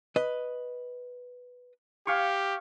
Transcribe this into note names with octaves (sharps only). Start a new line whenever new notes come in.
B4 D#5
G4 F5 G#5 C#6